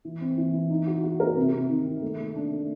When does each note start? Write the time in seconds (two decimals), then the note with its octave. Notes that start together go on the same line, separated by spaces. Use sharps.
0.05 E3
0.21 C4
0.38 E3
0.53 E3
0.70 D#4
0.87 F#4
1.04 F#4
1.20 A#4
1.37 C3
1.53 C3
1.69 D#3
1.86 D#3
2.02 A3
2.19 A3
2.36 D4
2.52 A3